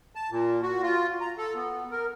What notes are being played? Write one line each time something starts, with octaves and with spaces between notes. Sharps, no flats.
A5
A#2
F#4
F4
A#5
A4
B3
A#4